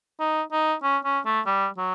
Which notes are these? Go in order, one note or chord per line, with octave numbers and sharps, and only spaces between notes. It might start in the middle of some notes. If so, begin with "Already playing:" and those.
D#4
D#4
C#4
C#4
A3
G3
F#3